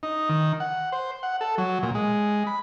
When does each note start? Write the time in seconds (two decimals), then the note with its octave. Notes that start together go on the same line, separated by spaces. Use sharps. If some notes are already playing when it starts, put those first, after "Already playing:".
0.03 D#4
0.29 D#3
0.60 F#5
0.92 C5
1.23 F#5
1.41 A4
1.58 F#3
1.83 A#2
1.95 G#3
2.47 B5